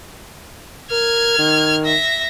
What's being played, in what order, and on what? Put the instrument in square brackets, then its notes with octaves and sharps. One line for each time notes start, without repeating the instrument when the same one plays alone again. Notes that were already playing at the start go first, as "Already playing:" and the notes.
[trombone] A#4 [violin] F6 G#6
[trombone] D#3
[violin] E5 A#6